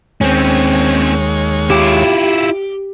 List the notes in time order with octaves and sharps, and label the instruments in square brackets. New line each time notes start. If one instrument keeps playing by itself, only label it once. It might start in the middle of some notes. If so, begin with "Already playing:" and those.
[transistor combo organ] D#2 G#3 C#5 [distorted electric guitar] C4 C#4
[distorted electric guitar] E4 F4 [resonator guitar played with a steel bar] G4